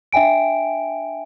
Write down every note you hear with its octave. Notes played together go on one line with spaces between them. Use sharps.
D4 E5 G5 G#5 D7